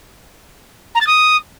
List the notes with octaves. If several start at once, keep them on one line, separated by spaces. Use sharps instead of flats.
A#5
A6
D#6